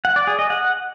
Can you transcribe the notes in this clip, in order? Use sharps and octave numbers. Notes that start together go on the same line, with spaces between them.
F#5
D5
G#4
D#5
F#5